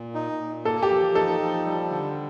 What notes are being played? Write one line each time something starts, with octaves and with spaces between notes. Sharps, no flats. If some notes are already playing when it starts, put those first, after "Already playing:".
Already playing: A#2
D#4
A#2
A#3 A4
G4
F3
D#4 A4
F3
G3
D3